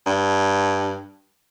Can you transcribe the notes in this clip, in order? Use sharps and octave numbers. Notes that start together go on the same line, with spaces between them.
G2